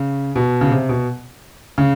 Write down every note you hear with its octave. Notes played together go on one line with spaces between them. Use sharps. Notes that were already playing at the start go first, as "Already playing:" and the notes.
Already playing: C#3
B2
C#3
C3
B2
C#3